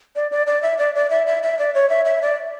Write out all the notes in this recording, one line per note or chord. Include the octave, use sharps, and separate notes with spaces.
D5
D5
D5
E5
D5
D5
E5
E5
E5
D5
C#5
E5
E5
D5